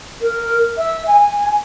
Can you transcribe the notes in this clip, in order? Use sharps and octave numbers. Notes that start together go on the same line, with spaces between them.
A#4
E5
G#5